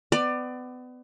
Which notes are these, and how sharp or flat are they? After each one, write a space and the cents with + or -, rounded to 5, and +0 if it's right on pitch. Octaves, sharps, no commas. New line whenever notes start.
B3 +30 D5 +20